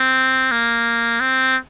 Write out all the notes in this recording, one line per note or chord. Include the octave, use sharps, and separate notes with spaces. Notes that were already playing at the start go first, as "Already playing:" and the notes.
Already playing: C4
A#3
C4